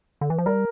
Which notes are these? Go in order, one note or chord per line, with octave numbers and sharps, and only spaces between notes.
D3
E3
F3
G3 A#4